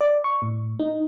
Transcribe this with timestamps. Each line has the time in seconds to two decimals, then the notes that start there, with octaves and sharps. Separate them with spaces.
0.01 D5
0.24 C#6
0.42 A2
0.79 D#4